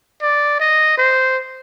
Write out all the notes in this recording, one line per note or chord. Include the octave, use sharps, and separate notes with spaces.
D5
D#5
C5